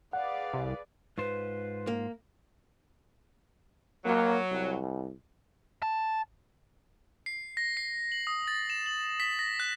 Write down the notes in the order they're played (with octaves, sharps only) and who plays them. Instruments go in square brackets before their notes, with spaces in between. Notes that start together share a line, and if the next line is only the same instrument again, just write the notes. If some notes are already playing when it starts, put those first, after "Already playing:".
[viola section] G#4 B4 D5 [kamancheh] F5 [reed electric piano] F#5
[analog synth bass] C2
[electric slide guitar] G#2 F4 C5 [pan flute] B4
[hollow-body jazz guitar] A#3
[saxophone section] F#3 [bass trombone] A#3
[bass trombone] C2
[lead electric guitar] A5
[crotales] C7
A#6
C7
F#7
D#6
A6
E7
F#7
B6
A#6
F#6